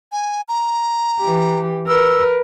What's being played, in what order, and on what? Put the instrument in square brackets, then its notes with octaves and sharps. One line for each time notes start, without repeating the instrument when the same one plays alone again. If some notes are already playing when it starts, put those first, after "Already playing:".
[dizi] G#5
A#5
[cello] E3 G4
[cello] A#4 B4 [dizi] E6